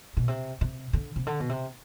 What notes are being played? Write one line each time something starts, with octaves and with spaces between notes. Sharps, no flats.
B2
C3
C3
D3
C3
D3
B2
C3